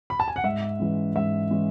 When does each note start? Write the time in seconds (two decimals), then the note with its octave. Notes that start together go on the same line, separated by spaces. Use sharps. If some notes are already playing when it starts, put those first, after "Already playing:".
0.10 B5
0.20 A5
0.28 G#5
0.36 F#5
0.44 G#2 E5
0.79 E3 G#3 C#4
1.15 G#2 E5
1.51 E3 G#3 C#4